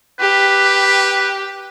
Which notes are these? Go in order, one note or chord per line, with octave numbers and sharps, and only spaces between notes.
G4 B4